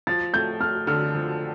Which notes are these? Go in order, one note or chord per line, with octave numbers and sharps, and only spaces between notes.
F3 A6
A3 G6
A3 F6
D3 F6
F3